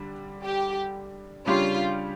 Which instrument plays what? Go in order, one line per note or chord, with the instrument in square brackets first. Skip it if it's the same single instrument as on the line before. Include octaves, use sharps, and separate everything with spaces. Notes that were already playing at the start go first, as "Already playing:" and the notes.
Already playing: [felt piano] D3 G3 D4
[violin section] G4
[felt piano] C#3 G3 D4 G4 C#5 [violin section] F4